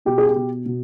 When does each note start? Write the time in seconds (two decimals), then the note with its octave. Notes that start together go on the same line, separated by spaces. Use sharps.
0.05 B2 G4
0.18 G#4
0.28 G4
0.36 B2
0.66 B2